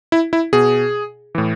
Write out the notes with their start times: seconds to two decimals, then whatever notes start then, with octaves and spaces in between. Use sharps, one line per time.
0.12 E4
0.33 E4
0.53 B2 G#4
1.35 A2 E3